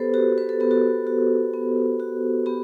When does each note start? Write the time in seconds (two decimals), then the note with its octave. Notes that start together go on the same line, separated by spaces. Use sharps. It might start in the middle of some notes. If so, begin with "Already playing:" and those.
Already playing: B3 G4 A4 B4 C5
0.14 F#4 G4 B4
0.38 B4
0.49 A4
0.60 B3 G4
0.71 F#4 A4
1.07 F#4
1.54 B3
2.00 F#4
2.46 B3 G4